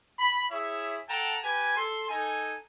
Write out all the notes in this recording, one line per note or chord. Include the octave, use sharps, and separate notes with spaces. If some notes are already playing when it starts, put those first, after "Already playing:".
B5
E4 G#4 C#5 E5
A4 F#5 G5 A5 A#5
G4 B4 G#5
A4 C6
D#4 A4 G#5